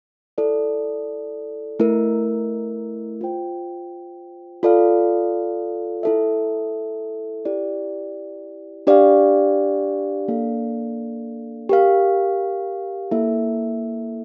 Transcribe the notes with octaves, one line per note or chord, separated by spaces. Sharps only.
E4 A4 D5
A3 E4 A#4
F4 C5 G5
F4 A4 D5 F5
E4 A4 E5
E4 G4 D5
D4 G4 D5 F5
A#3 D4 A4 D5 F5
G4 A#4 F5
A#3 E4 A4 E5